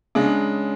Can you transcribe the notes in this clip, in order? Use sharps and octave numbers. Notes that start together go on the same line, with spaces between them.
C#3 G#3 D4